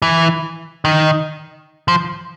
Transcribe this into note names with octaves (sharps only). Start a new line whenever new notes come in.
E3
D#3
F3